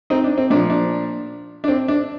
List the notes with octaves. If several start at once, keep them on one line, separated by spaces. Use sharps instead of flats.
C4 D#4
D4
C4
A#2 F3 D4
D4
D4
C4
D4